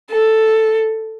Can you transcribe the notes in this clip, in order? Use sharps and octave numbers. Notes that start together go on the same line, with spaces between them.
A4